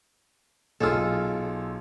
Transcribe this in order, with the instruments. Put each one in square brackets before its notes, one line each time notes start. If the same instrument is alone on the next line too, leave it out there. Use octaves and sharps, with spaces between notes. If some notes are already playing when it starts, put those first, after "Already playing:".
[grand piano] B1 E6 [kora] F4 G#4 A4